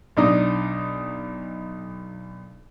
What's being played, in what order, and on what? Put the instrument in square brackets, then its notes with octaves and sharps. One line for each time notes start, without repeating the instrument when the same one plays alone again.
[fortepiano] B1 D4 D#4 D#5 D#6